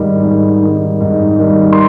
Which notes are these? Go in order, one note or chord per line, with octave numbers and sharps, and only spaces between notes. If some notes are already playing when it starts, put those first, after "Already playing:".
Already playing: G#2 D#3 G3
G#2
D#3 G3
G#2
D#3 G3
C6